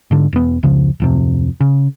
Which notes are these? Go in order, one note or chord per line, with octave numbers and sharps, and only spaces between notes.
G#2 D3
E1 B3
F1 C#2 C#3 F3
D1 F2 C3
C#3